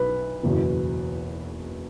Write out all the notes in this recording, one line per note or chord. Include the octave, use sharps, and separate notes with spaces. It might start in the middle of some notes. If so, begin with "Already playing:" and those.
Already playing: B1 B4
F#1 E2 B2